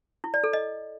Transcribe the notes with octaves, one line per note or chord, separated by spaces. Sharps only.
E4
D5
A4
D#5